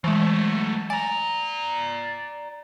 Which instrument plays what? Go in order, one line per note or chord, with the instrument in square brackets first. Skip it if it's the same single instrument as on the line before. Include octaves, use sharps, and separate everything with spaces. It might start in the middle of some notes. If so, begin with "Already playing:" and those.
[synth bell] E3 G#3 [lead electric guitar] F#3 A3
[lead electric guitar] D5 A#5 [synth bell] G#5